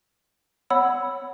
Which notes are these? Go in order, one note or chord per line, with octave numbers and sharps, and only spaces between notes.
C#5 F#5 B5 E6